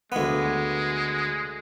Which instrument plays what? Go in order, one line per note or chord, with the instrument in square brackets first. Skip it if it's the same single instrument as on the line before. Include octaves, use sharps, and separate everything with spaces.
[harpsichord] D2 B3 [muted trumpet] G#3